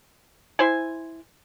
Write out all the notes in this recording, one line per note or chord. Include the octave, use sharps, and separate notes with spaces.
E4 C5 G#5